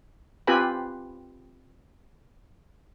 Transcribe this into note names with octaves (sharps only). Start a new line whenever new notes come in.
C4 F4 G4 B4 G#5 B5